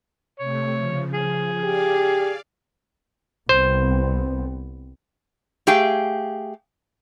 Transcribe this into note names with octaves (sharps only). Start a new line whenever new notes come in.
C3 A3 C#5
C#3 F3
G#4
G4 D5 F5
C2 B3 C4 C5
A3 G4 G#4 F5 G5